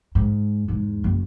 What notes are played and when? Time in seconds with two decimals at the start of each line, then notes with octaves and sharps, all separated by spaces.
0.15 G#2
0.68 E2 G#2
1.04 F#1